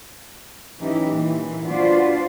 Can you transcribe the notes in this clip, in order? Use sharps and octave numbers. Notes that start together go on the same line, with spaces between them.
E3 C#4 D#4 E4 G4
A#2 E3
D4 F4 F#4 B4 C5 D5